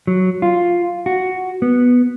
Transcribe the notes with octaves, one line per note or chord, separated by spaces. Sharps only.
F#3
F4
F#4
B3